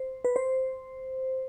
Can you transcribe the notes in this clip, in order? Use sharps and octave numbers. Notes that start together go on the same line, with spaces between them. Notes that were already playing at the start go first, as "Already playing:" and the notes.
Already playing: C5
B4
C5